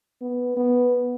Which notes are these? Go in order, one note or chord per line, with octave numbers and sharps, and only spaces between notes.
B3
B3